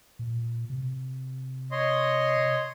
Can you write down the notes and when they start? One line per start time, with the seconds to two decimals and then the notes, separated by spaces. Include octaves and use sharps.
0.19 A#2
0.70 C3
1.71 C#5 D#5 C6